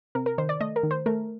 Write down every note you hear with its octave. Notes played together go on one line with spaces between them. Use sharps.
C3 A#4
A#4
D#3 C5
D5
A3 D#5
A#4
D#3
C5
A3 A#4